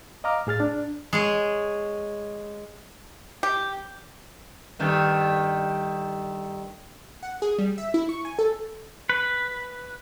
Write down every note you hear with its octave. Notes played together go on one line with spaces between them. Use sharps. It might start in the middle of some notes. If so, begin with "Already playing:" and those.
D#5 F5 A#5 D6 F6
A2 G#4 F6 A6
D4
G#3 G#4 C#5
G4
G2 D#3 A3
F#5
G#4
G3
E5
E4
C#6
G#5
A4
B4